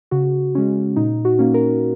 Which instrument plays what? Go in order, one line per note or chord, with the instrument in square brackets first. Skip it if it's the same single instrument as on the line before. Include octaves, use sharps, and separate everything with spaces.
[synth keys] C#3 F#4
G#3 C#4
A#2 D#4
F#4
A#3 C#4
A#4